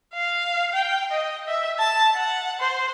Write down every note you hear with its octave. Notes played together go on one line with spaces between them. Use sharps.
F5
G5
D#5
E5
A5
F#5
C5